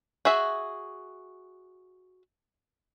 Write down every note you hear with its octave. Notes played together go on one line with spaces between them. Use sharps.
F#4 G#4 E5